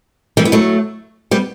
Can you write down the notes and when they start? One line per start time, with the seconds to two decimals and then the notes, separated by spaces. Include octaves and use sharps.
0.37 E3 G3
0.45 B3
0.52 F#3 A3
1.31 G3 B3